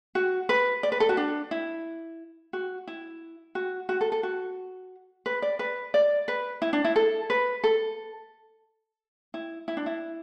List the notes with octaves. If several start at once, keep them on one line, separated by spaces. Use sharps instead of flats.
F#4
B4
D5
B4
A4
F#4
D4
E4
F#4
E4
F#4
F#4
A4
A4
F#4
B4
D5
B4
D5
B4
E4
D4
E4
A4
B4
A4
E4
E4
D4
E4